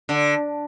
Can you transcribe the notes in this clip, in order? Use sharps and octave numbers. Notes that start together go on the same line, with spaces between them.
D3